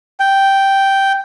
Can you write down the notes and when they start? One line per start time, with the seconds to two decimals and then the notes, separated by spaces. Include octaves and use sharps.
0.20 G5